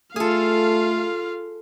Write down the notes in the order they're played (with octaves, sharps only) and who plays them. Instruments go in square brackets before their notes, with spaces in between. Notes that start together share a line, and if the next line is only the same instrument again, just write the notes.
[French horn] A3 [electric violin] F4 F5 [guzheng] G#4 A4